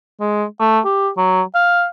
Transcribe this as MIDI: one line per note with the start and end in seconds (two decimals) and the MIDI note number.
0.20 0.44 56
0.60 0.79 57
0.85 1.09 67
1.17 1.42 54
1.55 1.86 77